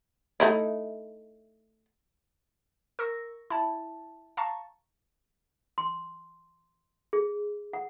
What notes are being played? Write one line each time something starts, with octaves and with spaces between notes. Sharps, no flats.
A3 D#4 E4
A#4 C#6 E6 A#6
E4 A5
F5 A5 A#5 C#6
C6
G#4
F#5